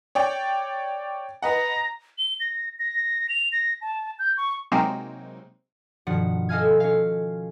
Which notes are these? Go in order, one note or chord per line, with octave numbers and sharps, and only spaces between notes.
C#5 D5 G5
B4 D#5 F#5 A#5
G7
A#6
A#6
F7
A#6
A5
G6
C#6
C3 F#3 G#3 A#3 C4 D#4
G2 B2 D#3 F3 F#5
A4 D#5 F5 G#5 F6 G#6
C#4 F5